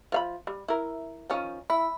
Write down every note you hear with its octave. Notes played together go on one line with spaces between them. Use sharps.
F3 F5 B5
G3
E4 A#4
D#3 F3 C#4
E4 B5